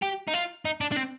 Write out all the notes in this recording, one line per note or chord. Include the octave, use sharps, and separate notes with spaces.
G4
D#4
F4
D#4
D4
D4
C4